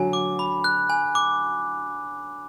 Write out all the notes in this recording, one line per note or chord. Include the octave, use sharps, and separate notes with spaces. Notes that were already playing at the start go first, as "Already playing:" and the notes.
Already playing: D3 F#3 G#5
D6
B5
F#6
G#5
D6